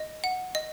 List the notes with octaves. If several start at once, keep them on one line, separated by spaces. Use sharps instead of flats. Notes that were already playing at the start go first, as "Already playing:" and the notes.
Already playing: D#5
F#5
D#5